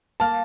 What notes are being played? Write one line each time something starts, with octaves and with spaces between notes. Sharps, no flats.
A#3 A5